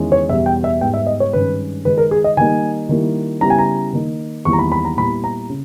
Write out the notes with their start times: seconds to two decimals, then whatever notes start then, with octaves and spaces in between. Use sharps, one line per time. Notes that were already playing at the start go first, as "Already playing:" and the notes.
Already playing: E2 D#3 G#3 C#4 E4
0.12 C#5
0.29 E2 B2 G3 E5
0.46 G5
0.64 E5
0.81 G#2 G3 B3 G5
0.94 E5
1.07 D#5
1.20 C#5
1.33 G2 D#3 G#3 C#4 B4
1.85 D#3 G#3 D#4 B4
1.98 A#4
2.11 G#4
2.24 D#5
2.37 D#3 G3 A#3 D#4 G#5
2.89 D#3 G3 A#3 E4
3.41 C#3 G3 B3 E4 A#5
3.50 G#5
3.59 A#5
3.93 D#3 A#3 D#4
4.45 E2 D#3 G3 A#3 E4 C#6
4.53 A#5
4.59 B5
4.72 B5
4.85 A#5
4.98 A#2 G3 B3 E4 B5
5.24 A#5
5.49 C#3